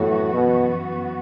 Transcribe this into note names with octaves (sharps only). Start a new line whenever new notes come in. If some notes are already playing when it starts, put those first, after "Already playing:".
Already playing: F#2 A2 E3 B3 F#4
B2